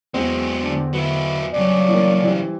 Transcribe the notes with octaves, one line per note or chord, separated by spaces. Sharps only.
E2 F#3 G#3 C4
D3 D4
F#3 E4 B4
G2 C#3 F#3 D5
E3 A#3 A#4
E3 G3 C4